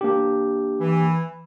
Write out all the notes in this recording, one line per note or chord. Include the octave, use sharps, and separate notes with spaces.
A#3 D4 G4
E3